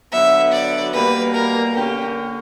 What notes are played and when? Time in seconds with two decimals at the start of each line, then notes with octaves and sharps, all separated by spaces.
0.12 D3 F#3 B3 E5
0.52 D5
0.94 B2 G3 A#3 B4
1.34 A#4
1.75 D3 A#3 C#4 G4